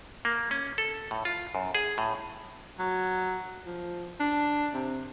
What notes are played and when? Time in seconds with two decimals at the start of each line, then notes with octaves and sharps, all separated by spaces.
0.25 A#3
0.51 C#4
0.78 A4
1.11 A2
1.25 F4
1.55 F#2
1.75 G#4
1.98 A2
2.79 F#3
3.66 F3
4.20 D4
4.74 C3